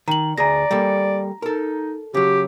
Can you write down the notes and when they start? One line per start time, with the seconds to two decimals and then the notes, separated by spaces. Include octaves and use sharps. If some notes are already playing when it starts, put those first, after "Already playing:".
0.08 D#3 A#5 F#7
0.38 D2 G#4 D5 A#5 A#6
0.71 G3 A#3 A4
1.42 D#4 A4 A#4
2.14 C#3 F#3 G4